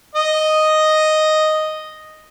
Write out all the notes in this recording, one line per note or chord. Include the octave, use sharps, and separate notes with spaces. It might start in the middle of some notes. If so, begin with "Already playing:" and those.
D#5 D#6